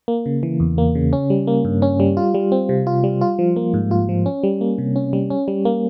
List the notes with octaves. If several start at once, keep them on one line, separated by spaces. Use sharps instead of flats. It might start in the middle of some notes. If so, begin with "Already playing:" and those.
A#3
C#3
E3
E2
A#3
C#3
C#4
G3
A#3
G2
C#4
G3
F4
G3
C4
C3
F4
G3
F4
F3
A#3
G#2
F4
F3
C#4
G3
A#3
C3
C#4
G3
C#4
G3
A#3